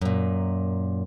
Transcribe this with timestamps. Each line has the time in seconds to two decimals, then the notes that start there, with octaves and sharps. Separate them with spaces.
0.01 F#2 A#2